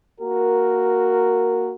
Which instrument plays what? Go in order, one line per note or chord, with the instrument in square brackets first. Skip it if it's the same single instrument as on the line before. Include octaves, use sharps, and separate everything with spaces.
[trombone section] A#3 F#4 A#4